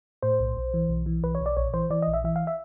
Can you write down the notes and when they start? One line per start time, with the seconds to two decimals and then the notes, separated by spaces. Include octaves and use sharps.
0.22 A2 C5
0.40 B1
0.57 B1
0.74 E3
0.89 B1
1.06 E3
1.23 B1 B4
1.35 C#5
1.41 B1 D5
1.57 A#1 C#5
1.74 E3 C5
1.90 E3 D5
2.02 D#5
2.08 A#1
2.13 E5
2.24 E3 E5
2.36 F5
2.47 E5